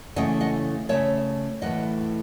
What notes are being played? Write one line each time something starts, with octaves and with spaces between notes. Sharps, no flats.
C#3 E3 A3 D#5 F#5
D#5 F#5
C#3 E3 A3 C#5 E5
A2 E3 A3 D#5 F#5